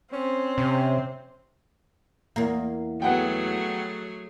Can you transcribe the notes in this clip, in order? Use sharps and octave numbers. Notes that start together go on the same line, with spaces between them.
C4 C#4
C3 C#4
E2 A#3
F#3 A3 B3 G#4 F#5 G5